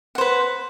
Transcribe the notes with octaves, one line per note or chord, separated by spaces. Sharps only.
B4 C5 F#5